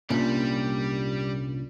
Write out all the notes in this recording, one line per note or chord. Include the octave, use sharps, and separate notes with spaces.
C2 A#2 G3 C#4 D4 F4